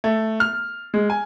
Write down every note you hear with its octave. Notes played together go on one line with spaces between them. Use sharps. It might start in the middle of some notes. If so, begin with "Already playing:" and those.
A3
F6
G#3
G#5